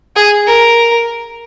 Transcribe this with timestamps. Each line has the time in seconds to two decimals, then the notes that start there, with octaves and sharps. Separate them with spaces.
0.16 G#4
0.47 A#4